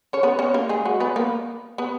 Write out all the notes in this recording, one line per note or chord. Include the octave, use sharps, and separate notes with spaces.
C#4 C#5
B3 B4
C#4 C#5
A#3 A#4
G#3 G#4
F#3 F#4
B3 B4
A#3 A#4
B3 B4